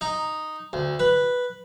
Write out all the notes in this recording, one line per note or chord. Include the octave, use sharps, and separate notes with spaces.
D#4
D2
B4